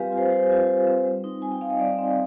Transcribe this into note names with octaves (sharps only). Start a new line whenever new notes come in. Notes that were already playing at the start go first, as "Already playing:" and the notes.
Already playing: G3 C4 F4 G4 B4 F5 G#5
C4 F4
C5
G3 C5
C4 F4
G3
C4 F4
G3
C4 D#4
G3 G#5
G5
C4 D#4 F5
D#5
G3 D5
C4 D#4